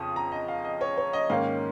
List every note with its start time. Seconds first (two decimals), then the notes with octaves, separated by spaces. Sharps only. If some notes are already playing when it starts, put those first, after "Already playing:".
Already playing: F2 C#3 F3 C#6 D#6
0.16 A#5
0.32 D#5
0.48 F5
0.65 D#5
0.81 C#5
0.98 C#5
1.13 D#5
1.30 G#2 D#3 A#3 C#4 F5